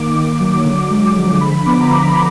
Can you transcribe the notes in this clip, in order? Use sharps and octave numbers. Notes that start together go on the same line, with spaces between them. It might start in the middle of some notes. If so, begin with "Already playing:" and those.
Already playing: D#3 A#3 D6
A#3
F#3
D3
G#3
F3
D3 B5
B3 D6
A#5
F3 B5